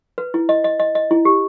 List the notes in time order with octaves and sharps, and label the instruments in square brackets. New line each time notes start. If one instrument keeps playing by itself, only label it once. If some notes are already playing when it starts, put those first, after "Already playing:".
[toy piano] B4
E4
D#5
D#5
D#5
D#5
E4
G4